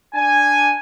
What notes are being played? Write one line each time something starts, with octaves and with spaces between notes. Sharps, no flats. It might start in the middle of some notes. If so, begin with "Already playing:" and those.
D4 G#5